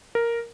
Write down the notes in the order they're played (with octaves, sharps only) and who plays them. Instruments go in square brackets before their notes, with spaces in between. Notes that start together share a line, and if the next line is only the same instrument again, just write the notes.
[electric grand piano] A#4